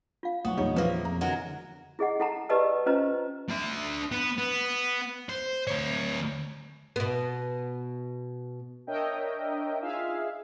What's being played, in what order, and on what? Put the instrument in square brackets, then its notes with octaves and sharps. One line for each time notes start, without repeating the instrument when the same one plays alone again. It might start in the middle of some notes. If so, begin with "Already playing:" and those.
[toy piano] F4 F5
[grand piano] B1 C#6 [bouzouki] B3 [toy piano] D#6
[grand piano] E2 A#2 [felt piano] G3 D#4 C#5
[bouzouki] C#3 A#3 [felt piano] F3 E4 [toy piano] B4
[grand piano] F1 B3 [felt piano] A#5
[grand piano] D3 E3 F#4 [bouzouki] F#3 G#3 A#4
[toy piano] E4 G#4 D#5 F#5
E4 A4 F#5 A5 A#5
G4 B4 D5 D#5 A5 E6
C#4 F4 B4 C5 D#5 A#5
[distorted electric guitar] D4 E5
B3
B3
C5
D2 C#5
[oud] B2 B3
[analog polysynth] D4 A#4 C#5 D#5 E5 G5
D#4 F4 G#4 E5 F5